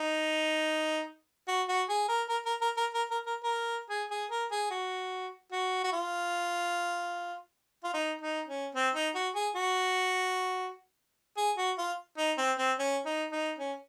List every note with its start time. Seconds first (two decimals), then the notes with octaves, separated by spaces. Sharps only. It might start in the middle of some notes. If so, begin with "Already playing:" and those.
Already playing: D#4
1.48 F#4
1.68 F#4
1.89 G#4
2.08 A#4
2.29 A#4
2.46 A#4
2.61 A#4
2.77 A#4
2.94 A#4
3.11 A#4
3.26 A#4
3.43 A#4
3.90 G#4
4.11 G#4
4.31 A#4
4.51 G#4
4.70 F#4
5.52 F#4
5.84 F#4
5.92 F4
7.84 F4
7.94 D#4
8.21 D#4
8.48 C#4
8.75 C4
8.95 D#4
9.15 F#4
9.35 G#4
9.55 F#4
11.37 G#4
11.57 F#4
11.78 F4
12.18 D#4
12.38 C4
12.58 C4
12.79 C#4
13.05 D#4
13.32 D#4
13.59 C#4